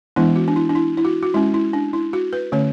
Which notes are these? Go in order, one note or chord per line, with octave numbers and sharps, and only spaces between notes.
E3 G#3 B3 D4 E4
F#4
D4
E4
D4
E4
E4
F#4
F#4
G#3 C#4 E4
E4
D4
E4
F#4
B4
D3 A3 C#4 C#5